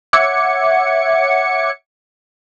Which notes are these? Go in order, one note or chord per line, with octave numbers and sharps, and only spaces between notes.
C#5 E5 F#5 D6 G#6 C#7